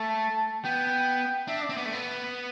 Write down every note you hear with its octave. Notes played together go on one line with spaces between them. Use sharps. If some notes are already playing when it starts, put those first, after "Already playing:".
Already playing: A3 A5
B3 G5
D4 E5
D5
C4
B3
A3
B3